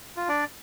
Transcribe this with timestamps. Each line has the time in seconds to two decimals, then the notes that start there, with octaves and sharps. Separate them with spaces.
0.17 F4
0.28 D4 D5